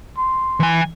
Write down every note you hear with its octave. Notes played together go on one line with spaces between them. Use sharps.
C6
E3 G#5